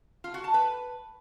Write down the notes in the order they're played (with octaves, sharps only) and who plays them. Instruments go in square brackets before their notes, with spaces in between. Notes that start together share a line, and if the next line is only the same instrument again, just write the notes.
[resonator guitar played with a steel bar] F4
F#4
A5
B4